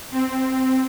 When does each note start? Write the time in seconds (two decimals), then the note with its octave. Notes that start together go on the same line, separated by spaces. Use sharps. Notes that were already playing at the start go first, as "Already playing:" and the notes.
0.12 C4